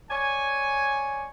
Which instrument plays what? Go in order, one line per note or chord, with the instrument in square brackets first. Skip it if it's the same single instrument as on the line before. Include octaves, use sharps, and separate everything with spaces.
[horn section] C#5 D5 G#5